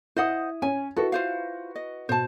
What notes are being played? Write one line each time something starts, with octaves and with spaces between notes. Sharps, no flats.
E4 C5 D#5 F#5 D#6
C#4 G#5
E4 F#4 A4 B4
F4 C5 F5
D#5
B2 C5 A5